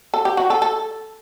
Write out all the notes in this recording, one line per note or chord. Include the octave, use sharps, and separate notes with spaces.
A4
G4
F#4
A4
A4